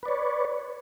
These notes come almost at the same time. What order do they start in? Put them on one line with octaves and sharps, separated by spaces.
B4 D5 C#5